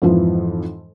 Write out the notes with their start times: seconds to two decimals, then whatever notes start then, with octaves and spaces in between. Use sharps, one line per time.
0.02 F2 G#2 E3 F3